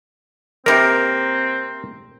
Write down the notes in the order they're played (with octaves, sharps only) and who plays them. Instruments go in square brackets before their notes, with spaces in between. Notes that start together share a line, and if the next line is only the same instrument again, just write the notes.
[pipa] C3 A#3 [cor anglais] C4 [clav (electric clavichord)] A#4